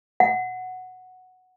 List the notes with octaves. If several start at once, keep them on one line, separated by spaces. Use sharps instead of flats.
F#5